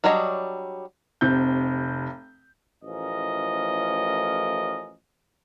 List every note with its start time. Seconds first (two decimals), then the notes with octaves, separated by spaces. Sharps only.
0.04 F#3 G3 D4 C#5 D#5
1.21 F1 C3 G6
2.83 A1 A2 F3 C#4 A#4 D#5